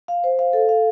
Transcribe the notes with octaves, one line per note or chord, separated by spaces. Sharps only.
F5
C5
F5
A4
F5